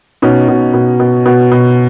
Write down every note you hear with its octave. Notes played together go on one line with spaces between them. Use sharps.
B2 C#4 D#4
B2
B2
B2
B2
B2